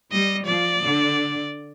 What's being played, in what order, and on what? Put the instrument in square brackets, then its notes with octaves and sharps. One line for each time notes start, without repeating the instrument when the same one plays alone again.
[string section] G3 [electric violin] D#5
[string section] F3 [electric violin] D5
[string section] D3